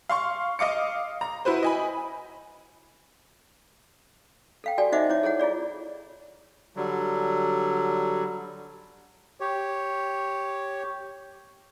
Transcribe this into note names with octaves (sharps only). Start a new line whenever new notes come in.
F5 C6 C#6
D#5 F5 D6 C#7
A#5
E4 F#4 B4 C5
D#5 G#5 B5
A4 F5 G5
F#4 G4 A4 D5 G#5
D#4 C5 D#5 E5 F#5 D6
E4 C#5 D6
G#4 A4 C#5 F#5
E4 F4 G#4 D5
D3 F#3 G3
G4 C#5